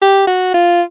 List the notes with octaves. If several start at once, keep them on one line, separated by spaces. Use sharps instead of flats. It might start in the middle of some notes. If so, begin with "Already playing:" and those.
G4
F#4
F4